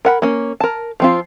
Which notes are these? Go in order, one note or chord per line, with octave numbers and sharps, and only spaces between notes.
A#4 F#5 B5
A#3 C#4
A#4 A5
F3 C4 F4